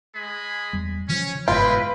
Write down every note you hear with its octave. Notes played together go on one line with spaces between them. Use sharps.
G#3 G#4 B5
E2 G3
C#3 E3 F3 C#4
G1 G#2 B2 G#3 E4 F4 B4 G5